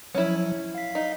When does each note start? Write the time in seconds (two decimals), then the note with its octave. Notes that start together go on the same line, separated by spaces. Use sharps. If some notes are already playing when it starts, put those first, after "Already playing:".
0.15 F3 F#3 C#4 E4
0.75 F5 B6
0.95 D#4